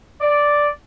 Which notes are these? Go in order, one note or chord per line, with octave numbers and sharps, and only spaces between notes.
D5